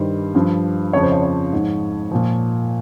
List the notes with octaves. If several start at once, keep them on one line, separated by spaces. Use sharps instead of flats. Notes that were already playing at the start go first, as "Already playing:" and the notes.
Already playing: G2 D#3 G3 C5
G2 F3
F2 C#3 F3 C#5
C5
C#5
C#5
G#2 F3
A#2 F3